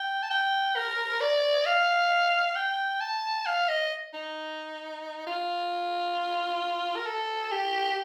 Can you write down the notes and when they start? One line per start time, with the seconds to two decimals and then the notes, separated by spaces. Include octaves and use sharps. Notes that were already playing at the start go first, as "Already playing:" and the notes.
Already playing: G5
0.23 A5
0.30 G5
0.76 A#4
1.21 D5
1.66 F5
2.56 G5
3.01 A5
3.46 F5
3.68 D#5
4.14 D#4
5.27 F4
6.96 A#4
7.06 A4
7.51 G4